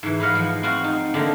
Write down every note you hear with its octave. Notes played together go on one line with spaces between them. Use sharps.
G#2 E3
B4 C5 D#5 F5 F#5
F3
C4 F4 F#4 C5
D#4
D3 A3 A#3 D#4